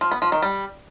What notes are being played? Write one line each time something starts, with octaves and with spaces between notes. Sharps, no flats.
F3
B3
F3
D#3
G3